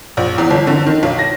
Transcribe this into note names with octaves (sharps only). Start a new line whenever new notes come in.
A#1
E2
G1
D3
D#3
B1
A#6